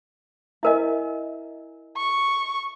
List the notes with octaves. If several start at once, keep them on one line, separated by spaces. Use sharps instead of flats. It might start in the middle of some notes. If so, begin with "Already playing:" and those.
E4 A#4 D#5 E5 G#5
C#6